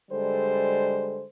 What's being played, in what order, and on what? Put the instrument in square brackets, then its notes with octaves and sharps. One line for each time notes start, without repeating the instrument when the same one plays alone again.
[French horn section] D3 G3 G#3 A4 C5